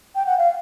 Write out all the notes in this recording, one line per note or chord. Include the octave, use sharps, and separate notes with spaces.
G5
F#5
F5